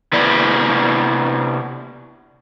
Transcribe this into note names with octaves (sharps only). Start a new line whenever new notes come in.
C3 B3 E4 B4 D5